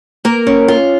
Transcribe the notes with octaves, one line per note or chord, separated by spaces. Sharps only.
A#3 A#4
C#4
F4